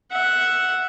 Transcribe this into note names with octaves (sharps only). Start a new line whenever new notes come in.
E5 F#5